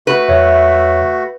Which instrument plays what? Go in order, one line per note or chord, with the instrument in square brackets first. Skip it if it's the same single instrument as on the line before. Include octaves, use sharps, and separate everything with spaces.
[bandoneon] A3 F#4 [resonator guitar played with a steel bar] B4
[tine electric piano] E2 C#5 [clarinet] E5